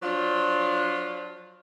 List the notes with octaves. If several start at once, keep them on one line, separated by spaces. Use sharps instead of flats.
F3 F#3 D4 F4